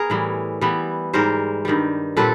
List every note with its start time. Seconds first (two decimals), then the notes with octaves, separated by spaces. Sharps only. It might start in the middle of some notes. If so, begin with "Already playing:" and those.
Already playing: B3 G#4 A#4
0.10 A2 E3 G3
0.61 E3 G3 B3
1.13 G#2 E3 G3 A#4 C5
1.65 G2 D#3 G3
2.17 A#2 G3 C4 A4 B4